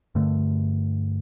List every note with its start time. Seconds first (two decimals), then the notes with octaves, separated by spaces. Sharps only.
0.15 G2 D3 A3